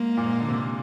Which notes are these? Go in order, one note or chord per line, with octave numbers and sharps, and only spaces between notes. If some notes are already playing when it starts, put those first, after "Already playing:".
Already playing: G#2 A#3
A#2
G#2
D3
C3